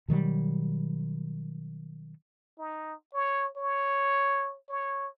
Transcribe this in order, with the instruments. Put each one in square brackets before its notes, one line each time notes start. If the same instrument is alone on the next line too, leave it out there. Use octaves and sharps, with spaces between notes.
[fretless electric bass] B2 D#3 F#3 G3
[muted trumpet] D#4
C#5
C#5
C#5